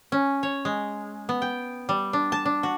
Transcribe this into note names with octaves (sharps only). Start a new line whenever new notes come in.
C#4
C#5
G#3
B3
G5
G3
D4
A5
D4
F#4